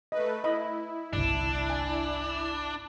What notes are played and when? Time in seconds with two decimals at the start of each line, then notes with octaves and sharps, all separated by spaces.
0.12 A3 B4 D#5
0.44 E4 D#5 B5
1.13 G1 C2 D4
1.70 G#5